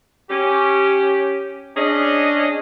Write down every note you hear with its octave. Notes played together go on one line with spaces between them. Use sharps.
C#4 G4
C#4 D4 G#4 D#5